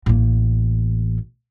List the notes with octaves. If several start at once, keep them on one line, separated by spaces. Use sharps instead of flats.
A1 A#3